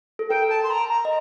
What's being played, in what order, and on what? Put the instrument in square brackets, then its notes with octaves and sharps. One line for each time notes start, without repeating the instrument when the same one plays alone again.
[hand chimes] A4
[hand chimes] A#4 [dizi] G5
[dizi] A5
C6
A#5
A#5
[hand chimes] D#5